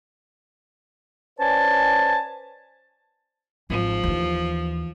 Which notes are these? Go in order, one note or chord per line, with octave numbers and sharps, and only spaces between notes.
C#4 B4 C5 D5 G#5 A5
G#1 F3
D#2 E3